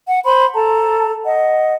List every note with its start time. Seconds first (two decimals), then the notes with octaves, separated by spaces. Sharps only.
0.08 F#5
0.25 C5 B5 C6
0.55 A4 A5 A#5
1.26 D#5 F#5